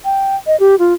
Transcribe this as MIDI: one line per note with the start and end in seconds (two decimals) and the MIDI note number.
0.05 0.36 79
0.47 0.56 75
0.60 0.75 67
0.79 0.94 65